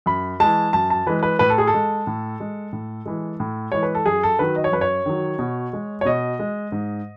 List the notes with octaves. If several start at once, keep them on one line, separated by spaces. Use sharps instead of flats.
F#2 B5
E3 G#3 A5
F#2 A5
A5
E3 G#3 B4
B4
A2 B4
A4
G#4
A4
G#3
A2
G#3
A2
E3 G#3
A2
E3 G#3 C#5
B4
A4
F#2 G#4
A4
D#3 F#3 B4
D#5
C#5
F#2 B4
C#5
D#3 F#3
B2
G#3
C#5
B2 D#5
G#3
G#2